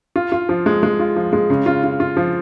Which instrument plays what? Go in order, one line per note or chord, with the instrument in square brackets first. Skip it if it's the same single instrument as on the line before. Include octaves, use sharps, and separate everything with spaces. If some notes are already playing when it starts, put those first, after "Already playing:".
[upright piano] F4
F4
F3
G#3
G#3
F4
F3
G#3
C#3
F4
F4
F4
F3